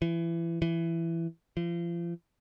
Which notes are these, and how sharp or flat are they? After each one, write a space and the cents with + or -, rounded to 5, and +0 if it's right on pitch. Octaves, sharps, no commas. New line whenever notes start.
E3 +25
E3 +15
F3 -35